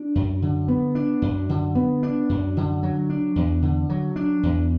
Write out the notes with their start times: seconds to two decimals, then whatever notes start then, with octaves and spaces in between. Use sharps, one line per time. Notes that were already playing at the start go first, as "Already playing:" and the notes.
Already playing: D4
0.15 F#2
0.42 D3
0.68 B3
0.95 D4
1.22 F#2
1.49 D3
1.75 B3
2.03 D4
2.29 F#2
2.57 D3
2.83 F#3
3.10 D4
3.36 E2
3.62 D3
3.89 F#3
4.16 D4
4.43 E2